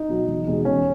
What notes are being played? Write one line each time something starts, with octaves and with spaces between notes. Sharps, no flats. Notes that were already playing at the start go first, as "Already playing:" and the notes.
Already playing: D#4
B2 F#3
E1
E2 B2 G#3
E1 C#4